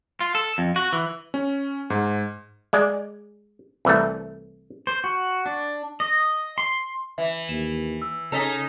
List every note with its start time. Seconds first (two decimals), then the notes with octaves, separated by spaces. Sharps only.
0.20 F4
0.35 A4
0.58 F2
0.76 F#4
0.93 E3
1.34 C#4
1.90 G#2
2.73 G#3 D5
3.85 C2 E3 A3
4.87 C5
5.04 F#4
5.46 D4
6.00 D#5
6.58 C6
7.18 E3 E5
7.49 D#2 E7
8.02 E6
8.32 C#3 C#4 D#4 A4 G#5 B6 F7